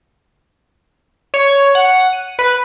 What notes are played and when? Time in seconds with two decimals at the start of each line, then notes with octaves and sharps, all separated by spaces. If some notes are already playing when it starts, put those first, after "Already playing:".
1.34 C#5
1.75 F#5
2.13 D#7
2.39 B4